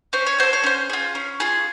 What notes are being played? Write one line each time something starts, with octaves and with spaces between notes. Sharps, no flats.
C#4 C5
C#5
F#4 A4 C5
C#5
C#4 C5
F4 G#4
C#4
F4 G#4